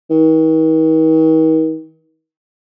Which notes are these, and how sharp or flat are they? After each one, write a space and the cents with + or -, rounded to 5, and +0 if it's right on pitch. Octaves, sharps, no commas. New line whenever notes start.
D#3 +45